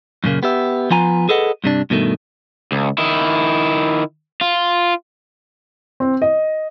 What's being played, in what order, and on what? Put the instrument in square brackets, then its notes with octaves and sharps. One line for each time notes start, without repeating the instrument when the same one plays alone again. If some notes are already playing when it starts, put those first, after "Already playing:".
[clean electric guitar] F#2 A#2 C#3 A#3
B3 G4 E5
F3 B3 F4 G#5 A#5
G#4 A4 B4 D#5 F#5
G2 C3 D4
G2 B2 D#3 A3
[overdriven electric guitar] C#2
D#3 E4
F4
[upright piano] C4
D#5